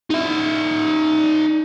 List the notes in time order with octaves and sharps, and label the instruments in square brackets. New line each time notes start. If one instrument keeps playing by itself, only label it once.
[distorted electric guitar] D#4 E5